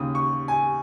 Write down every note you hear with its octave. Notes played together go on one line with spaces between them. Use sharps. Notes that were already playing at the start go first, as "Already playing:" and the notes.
Already playing: D#2 C#3 D#6
C#6
G#5